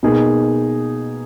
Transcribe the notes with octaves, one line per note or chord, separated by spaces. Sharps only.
B2 A#3 D#4 G#4